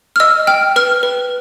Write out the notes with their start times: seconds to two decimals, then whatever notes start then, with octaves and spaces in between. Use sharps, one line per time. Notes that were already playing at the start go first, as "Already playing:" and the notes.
0.16 F6
0.20 D#5 E6
0.47 G5 F6
0.76 B4 F6
1.03 B4